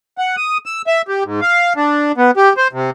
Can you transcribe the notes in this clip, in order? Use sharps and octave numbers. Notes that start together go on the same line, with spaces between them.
F#5
D#6
E6
E5
G4
G#2
F5
D4
B3
G4
C5
C3